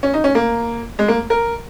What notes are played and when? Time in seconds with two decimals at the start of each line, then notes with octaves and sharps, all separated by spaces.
0.03 C#4
0.14 D#4
0.24 C#4
0.35 A#3
0.99 G#3
1.08 A#3
1.30 A#4